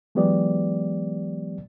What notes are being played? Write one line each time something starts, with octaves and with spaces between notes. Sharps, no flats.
E3 F#3 G#3 B3 G4 D5